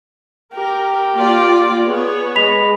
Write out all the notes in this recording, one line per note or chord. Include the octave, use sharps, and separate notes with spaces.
G4 A#4
A#3 F4 D5
B3 G#4 C#5
G#3 B5 B6 F7